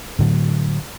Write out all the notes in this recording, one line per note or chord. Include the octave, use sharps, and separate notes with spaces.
A2 D3 F#3